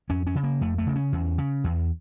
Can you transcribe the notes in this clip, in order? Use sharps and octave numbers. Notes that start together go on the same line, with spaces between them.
F2 C#4
C#4
C#3
A#3
F2 A3
A3
C#3
C#4
E2
C#3
E2